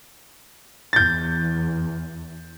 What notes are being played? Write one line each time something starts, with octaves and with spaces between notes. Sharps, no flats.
E2 G6 A6